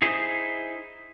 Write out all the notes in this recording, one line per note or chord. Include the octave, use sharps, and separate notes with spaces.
D#4 E4 G#4 C5